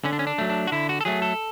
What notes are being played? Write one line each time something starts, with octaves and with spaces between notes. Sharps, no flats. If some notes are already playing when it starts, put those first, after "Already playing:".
D3 C#4
D4
C#4
D4
F#3 A3
D4
F#4
D3 E4
F#4
A4
F#3 A3 G#4
A4